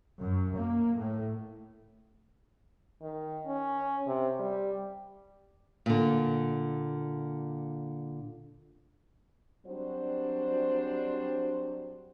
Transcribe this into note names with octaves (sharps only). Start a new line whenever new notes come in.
F#2
A#3
A2
D#3
C#4
C3
G3
A#2 D3
F#3 G3 C4 D4 F#4 C5